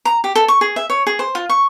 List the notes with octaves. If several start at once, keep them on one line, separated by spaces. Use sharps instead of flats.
A#5
G4
A4
C#6
G#4
E5
C#5
G#4
C5
F4
C#6